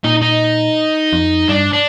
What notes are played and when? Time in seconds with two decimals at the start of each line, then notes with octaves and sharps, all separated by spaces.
0.04 A#2 D#4
0.22 D#4
1.13 F2
1.49 G2 D4
1.73 D4